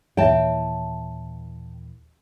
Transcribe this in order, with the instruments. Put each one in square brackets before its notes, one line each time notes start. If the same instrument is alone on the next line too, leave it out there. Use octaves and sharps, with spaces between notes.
[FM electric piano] D#2 A#2 E3 [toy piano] C#5 E5 [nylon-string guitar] G5 A5